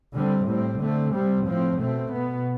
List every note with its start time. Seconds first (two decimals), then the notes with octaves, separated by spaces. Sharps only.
0.15 D3 G3 C4
0.48 A2 G3 C4
0.80 D3 A3 C4
1.14 C3 G3 C4
1.47 A2 F3 C4
1.80 B2 A3 C4
2.12 B2 B3